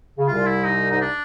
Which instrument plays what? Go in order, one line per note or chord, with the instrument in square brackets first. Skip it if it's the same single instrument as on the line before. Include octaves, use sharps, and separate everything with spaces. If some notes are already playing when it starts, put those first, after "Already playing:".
[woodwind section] C#3
[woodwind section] C2 C3 [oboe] F4
[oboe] E4
D#4
[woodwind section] G#2 [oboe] D#4
[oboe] D4